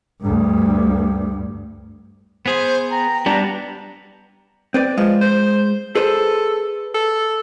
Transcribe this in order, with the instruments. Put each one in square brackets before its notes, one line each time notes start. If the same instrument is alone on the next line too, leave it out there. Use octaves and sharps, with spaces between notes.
[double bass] D2 G2
[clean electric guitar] B3 G#4 [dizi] C5
[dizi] G5 [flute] A#5
[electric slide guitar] G3 D4 [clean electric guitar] B3 [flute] A#5
[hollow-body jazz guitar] C4 B4 D5
[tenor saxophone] F3 [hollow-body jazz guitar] G#3
[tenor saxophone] C5
[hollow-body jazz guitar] G#4 B4 C5 [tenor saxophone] A4
[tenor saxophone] A4